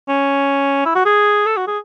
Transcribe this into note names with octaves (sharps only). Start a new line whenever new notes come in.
C#4
E4
F#4
G#4
A4
F#4
G#4